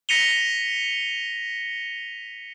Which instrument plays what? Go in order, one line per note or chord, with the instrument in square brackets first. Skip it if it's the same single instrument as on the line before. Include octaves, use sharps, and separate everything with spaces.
[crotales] A#6 B6 C#7 D#7 F7 G7